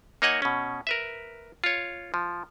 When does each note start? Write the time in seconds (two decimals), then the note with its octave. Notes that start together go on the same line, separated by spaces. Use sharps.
0.22 A#3 D#4 C#5 D#5 F#5 G#5
0.42 B2 C#4
0.87 A#4 B4 E5
1.64 F4 C#5
2.14 F3